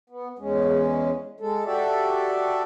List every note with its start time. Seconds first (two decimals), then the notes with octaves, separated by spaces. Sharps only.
0.10 B3
0.39 E2 G#3 C#4
1.40 G#3 A4
1.65 F#4 G4 A4 D5 E5